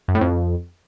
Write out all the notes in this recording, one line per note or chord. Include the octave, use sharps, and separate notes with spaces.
F#2
A2
F2